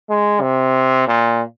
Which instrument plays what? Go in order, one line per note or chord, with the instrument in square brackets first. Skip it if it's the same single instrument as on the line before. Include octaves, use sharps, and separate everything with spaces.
[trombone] G#3
C3
A#2